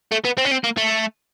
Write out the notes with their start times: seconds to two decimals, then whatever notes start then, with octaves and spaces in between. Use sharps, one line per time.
0.12 A3
0.25 B3
0.38 C4
0.45 C#4
0.52 C4
0.64 A#3
0.77 A3